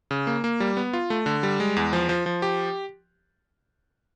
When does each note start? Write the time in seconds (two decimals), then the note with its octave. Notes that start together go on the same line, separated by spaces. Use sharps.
0.11 C#3
0.27 A#3
0.44 A#3
0.60 G3
0.77 B3
0.93 F4
1.10 A3
1.26 D3
1.43 G3
1.60 G#3
1.76 E2
1.93 F3
2.09 F3
2.26 F3
2.42 G4